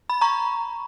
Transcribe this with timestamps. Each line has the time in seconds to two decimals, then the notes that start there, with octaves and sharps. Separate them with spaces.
0.09 B5
0.21 A#5 C#6